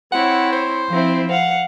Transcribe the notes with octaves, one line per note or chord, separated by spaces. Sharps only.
C4 E4 C#5 F#5
C5
F3 C4 E4
F5 F#5